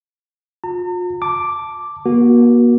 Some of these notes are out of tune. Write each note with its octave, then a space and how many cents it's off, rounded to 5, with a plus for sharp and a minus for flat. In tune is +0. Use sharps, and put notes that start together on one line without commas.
F4 +40 A#5 -45
A5 +0 D6 +0
A#3 +40 F#4 +0